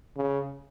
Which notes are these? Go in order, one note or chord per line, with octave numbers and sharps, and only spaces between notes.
C#3